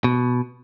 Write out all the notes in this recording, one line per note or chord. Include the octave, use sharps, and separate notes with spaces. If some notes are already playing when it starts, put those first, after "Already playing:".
B2